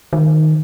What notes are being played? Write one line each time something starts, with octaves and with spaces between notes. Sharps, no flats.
D#3